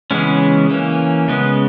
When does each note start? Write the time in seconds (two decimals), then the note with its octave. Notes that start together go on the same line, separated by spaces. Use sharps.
0.11 C#3 E3 G#3 B3 C#4
0.70 E3 A#3 C#4
1.28 C#3 G#3 B3